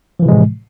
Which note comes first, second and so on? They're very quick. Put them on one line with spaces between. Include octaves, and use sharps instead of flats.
F3 E3 C3 G#3 A2